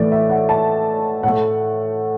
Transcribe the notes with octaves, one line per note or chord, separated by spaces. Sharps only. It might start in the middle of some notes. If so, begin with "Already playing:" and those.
Already playing: A2 E3 A3 B4 D5
E5
F#5
A5
A2 A3 F#5